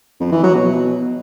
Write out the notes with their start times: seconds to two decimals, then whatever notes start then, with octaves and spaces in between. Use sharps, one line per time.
0.20 F2
0.32 E3
0.43 F#3
0.55 B2